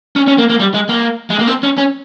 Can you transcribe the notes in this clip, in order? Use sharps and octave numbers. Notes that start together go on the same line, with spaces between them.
C#4
C#4
A#3
A#3
G3
G#3
A#3
G#3
A#3
C4
C#4
C#4